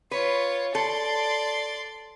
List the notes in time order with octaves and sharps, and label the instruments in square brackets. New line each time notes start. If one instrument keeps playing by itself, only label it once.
[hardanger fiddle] F4 C#5 [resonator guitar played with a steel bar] B4
[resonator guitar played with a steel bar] A4 [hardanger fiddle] D5 C6